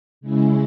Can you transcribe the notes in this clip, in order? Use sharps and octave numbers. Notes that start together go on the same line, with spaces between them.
C#3 G#3 C#4 E4